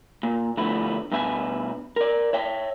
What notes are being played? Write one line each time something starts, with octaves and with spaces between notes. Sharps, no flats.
A#2
D3 F3 G3 A3 B3 E4
G2 B2 B4 E5 G#5
A#4 D5
C#5 E5 G5